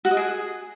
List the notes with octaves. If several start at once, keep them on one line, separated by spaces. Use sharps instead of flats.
F#4
D#5
G#4